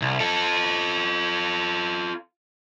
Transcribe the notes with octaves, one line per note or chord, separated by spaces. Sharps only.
C2
F4 A4